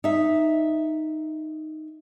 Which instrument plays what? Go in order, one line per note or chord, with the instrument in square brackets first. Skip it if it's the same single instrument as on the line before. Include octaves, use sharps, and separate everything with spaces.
[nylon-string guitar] D#4 E5